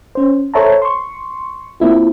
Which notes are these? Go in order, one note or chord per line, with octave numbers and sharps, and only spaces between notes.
C#4 C5
A4 C5 C#5 E5 A5 A#5
C6 C#6
A#3 C4 E4 F4